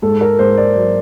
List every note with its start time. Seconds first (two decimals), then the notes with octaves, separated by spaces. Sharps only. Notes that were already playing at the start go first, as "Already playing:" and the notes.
0.02 G#2 A4
0.21 A#4
0.39 G#2 C5
0.57 D5
0.76 F#3